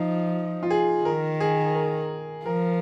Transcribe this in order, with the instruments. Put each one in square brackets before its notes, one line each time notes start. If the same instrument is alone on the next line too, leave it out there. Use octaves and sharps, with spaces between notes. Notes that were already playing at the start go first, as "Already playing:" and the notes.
Already playing: [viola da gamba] F3 [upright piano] D#4
[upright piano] F4
G#4
[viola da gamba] D#3 [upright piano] A#4
[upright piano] G#4
A#4
[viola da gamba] F3 [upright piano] A#4